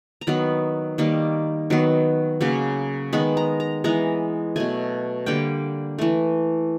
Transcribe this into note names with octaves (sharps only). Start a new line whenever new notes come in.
A#5
D#3 F#3 B3 B5
D#3 G3 A#3
D#3 F#3 B3
C#3 F#3 A#3
D#3 G#3 B3 B5
A#5
A#5
E3 G#3 B3 A#5
B2 F#3 A3 G#5
D3 G3 A#3 G5
E3 A3